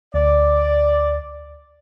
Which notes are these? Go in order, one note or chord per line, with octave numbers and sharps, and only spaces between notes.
D2 D5